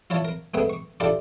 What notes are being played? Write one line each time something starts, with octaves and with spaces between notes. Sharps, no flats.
E4 F4 C#5 A5
A#4
G#3 A3 B3 C4 B4 E5
C#6
D4 E4 F4 G4 A4